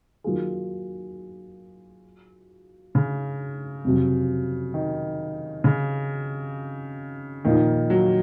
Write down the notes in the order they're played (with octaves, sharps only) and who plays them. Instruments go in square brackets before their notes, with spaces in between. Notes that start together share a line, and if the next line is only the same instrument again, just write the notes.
[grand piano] D#3 F#3 A#3 F4 G#4
[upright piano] C#3
[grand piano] F2 C3 F#3
[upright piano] D#3
C#3
[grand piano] A#2 F3 A#3 D#4 [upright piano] D#3
[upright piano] F#3